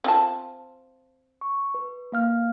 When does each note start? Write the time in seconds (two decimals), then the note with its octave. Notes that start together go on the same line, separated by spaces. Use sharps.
0.04 C4 F4 A5
1.41 C#6
1.74 B4
2.12 A#3 F5 F6